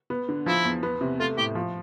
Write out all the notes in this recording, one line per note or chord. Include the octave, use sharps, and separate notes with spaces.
B3
D3
F3 E4
E2
B3
C3
A3 F4
A2 G4
F3